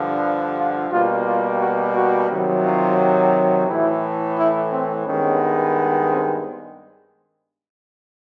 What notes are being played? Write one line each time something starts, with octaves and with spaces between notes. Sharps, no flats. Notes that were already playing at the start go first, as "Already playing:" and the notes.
Already playing: G2 D3 F3
F4
B2 G3 A#3 F4
F4
F#4
F#4
C3 D#3 F#3
F4
A2 E3 A3 E4
E4
C4
G2 D#3 G#3 B3 C#4
C4